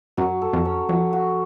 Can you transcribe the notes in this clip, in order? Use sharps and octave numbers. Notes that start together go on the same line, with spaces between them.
F#2 F#3
A4
F2
C#4
F2 F#3
F#4